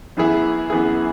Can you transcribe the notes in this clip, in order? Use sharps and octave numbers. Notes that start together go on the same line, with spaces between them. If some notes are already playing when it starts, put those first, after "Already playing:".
F#2 E3 B3 E4 G#4
F#2 E3 B3 E4 G#4